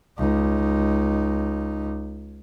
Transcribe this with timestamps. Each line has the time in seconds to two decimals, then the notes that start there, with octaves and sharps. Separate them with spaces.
0.17 C#2 D#4